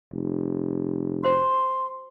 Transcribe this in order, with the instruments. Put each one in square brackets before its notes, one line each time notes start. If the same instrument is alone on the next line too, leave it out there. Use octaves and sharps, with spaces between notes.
[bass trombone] F1
[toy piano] F#4 C5 [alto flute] C6